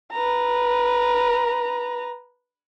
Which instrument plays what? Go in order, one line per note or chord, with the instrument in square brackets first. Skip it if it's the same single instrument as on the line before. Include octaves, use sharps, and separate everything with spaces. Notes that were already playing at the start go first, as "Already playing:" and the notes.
[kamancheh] B4 A#5